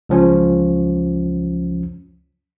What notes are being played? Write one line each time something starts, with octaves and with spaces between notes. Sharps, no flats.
C#2 F3 C#4